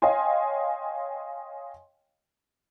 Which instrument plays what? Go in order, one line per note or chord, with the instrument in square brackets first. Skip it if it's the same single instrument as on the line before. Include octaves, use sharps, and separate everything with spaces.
[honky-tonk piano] C#5 D#5 F5 G5 G#5 C6